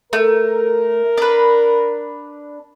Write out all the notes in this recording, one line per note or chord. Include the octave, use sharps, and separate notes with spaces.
A3 A#4
D4 B4